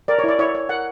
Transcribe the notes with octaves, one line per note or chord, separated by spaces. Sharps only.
A#4 D5
C#5
E4 D5
E4 C#5
C#5
A#4 F#5